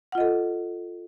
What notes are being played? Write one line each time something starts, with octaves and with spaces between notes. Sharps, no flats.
F4 A4 D#5 F#5